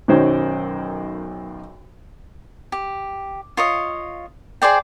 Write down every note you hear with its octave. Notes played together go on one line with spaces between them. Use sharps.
B1 F#2 D#3 F#3 C5 C#5
G4
F4 C#5 D#5
G#4 C5 D5 G5